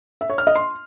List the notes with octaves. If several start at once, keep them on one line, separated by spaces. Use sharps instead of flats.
E5
C#5
F6
D#5
C6